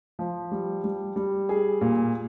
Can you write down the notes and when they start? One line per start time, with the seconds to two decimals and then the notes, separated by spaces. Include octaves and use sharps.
0.19 F3
0.51 G3
0.84 G3
1.16 G3
1.49 G#4
1.81 A#2